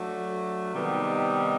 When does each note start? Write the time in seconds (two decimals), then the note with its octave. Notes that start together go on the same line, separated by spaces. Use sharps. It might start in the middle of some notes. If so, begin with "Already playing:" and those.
Already playing: F#3 A3 D4
0.73 C3 D#3 G3 B3 D#4